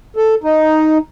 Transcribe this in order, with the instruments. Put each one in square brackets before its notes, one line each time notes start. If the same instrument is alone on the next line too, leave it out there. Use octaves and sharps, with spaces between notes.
[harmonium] A4
D#4